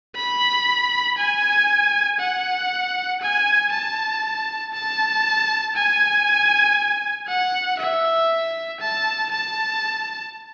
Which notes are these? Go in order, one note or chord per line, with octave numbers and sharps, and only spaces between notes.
B5
G#5
F#5
G#5
A5
A5
G#5
F#5
E5
A5
A5